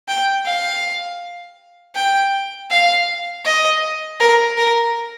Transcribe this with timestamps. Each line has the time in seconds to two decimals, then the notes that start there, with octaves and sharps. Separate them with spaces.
0.08 G5
0.45 F5
1.95 G5
2.70 F5
3.44 D#5
4.20 A#4
4.57 A#4